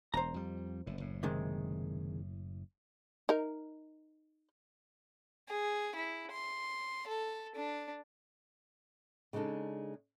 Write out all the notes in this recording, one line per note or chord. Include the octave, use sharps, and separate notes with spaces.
E1 C5 A#5
F2 G3
F#1 A2
F#1 A2
C3 D#3 G#3
D#4 A#4
G#4
E4
C6
A4
D4
C#3 G#3 D4 D#4 A4